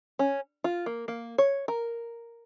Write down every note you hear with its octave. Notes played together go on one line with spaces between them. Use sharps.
C#4
F4
A#3
A#3
C#5
A#4